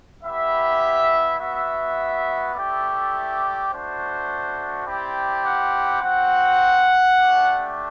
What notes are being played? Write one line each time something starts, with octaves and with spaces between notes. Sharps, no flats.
B3 E4 G4 E5
B3 F#4 E5
A3 E4 G4 D5
A3 D4 F#4 C5
C4 E4 G4 D5
F#5
C4 F#4 F#5
A3 D4 G4